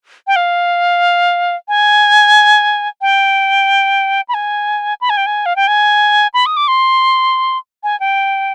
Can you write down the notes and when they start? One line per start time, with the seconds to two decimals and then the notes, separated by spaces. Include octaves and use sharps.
0.27 G5
0.36 F5
1.68 G#5
3.01 G5
4.28 B5
4.34 G#5
5.01 B5
5.10 G#5
5.17 G5
5.26 G#5
5.46 F5
5.56 G5
5.67 G#5
6.34 B5
6.46 D#6
6.57 D6
6.68 C6
7.83 G#5
8.00 G5